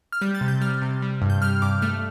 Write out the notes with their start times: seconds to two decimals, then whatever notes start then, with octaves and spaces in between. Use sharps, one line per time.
0.12 F6
0.21 G3 G6
0.35 A6
0.41 C3
0.48 G6
0.61 G3 F6
0.82 C3
1.02 G3
1.22 G2
1.30 G6
1.42 G3 F6
1.62 G2 D6
1.82 A3 F6